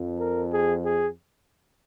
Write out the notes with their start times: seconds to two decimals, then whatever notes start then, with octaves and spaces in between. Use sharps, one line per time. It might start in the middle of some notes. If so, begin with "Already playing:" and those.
Already playing: F2 F3
0.19 A#4
0.51 G#4
0.84 G#4